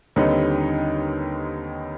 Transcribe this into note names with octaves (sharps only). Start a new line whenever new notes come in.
D#2 D3 G3 C4 D#4 B4 C#5